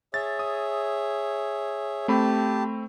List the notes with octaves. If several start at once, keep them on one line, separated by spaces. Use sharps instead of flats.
G#4 C#5 E5 A6
D#6
A3 C4 G4 A5 B5